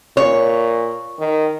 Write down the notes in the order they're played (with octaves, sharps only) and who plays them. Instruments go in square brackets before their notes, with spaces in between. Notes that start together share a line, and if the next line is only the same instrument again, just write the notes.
[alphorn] A#2 [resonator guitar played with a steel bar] C#5
[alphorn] D#3